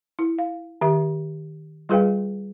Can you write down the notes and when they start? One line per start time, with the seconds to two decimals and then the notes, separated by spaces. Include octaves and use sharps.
0.19 E4
0.39 F5
0.81 D#3 G4 E5
1.89 G3 F4 G#4 B4 F5 G5